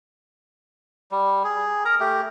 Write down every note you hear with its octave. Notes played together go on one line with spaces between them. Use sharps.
G3
G#4
A#4 A#5
A3 G4